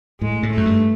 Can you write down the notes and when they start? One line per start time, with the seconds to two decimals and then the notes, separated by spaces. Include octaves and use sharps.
0.21 A2 G#3
0.43 A2
0.51 A3
0.57 F#2
0.65 G2